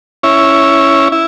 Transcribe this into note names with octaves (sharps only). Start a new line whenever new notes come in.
C#4 E4
E4